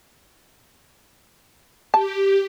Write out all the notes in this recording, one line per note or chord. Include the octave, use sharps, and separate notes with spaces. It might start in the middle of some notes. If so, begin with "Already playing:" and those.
G4 A5